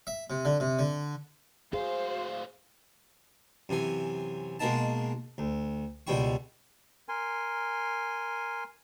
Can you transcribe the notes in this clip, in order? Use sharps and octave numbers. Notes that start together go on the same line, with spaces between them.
E5
C3
D3
C3
D3
A2 F#4 G#4 C5 F5
F#2 C3 E3 G#5
B2 G#3 A#3 D#4 A5
D2
C#2 B2 G3 E4 G5 C#6
A#4 G#5 C6